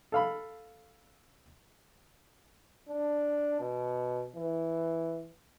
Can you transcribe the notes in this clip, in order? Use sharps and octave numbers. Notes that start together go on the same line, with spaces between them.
A4 F5 B5
D4
B2
E3